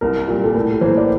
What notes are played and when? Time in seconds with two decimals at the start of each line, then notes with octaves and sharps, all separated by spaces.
0.01 C2 A#4
0.28 A#2 G3
0.44 A4
0.55 A2 A#4
0.81 E3 C5
0.86 A#3
0.97 D5